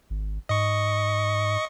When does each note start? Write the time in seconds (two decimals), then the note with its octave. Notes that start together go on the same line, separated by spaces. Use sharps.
0.10 G#1
0.49 G#2 D#5 C#6